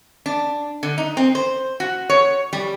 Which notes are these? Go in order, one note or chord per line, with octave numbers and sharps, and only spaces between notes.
D4
D3
D#4
C4
C5
F#4
C#5
G3